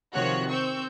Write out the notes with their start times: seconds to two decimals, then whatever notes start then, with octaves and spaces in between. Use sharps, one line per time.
0.13 C3 D#3 F3 F#4 C#5 F#6
0.48 C4 C#6 E6 G6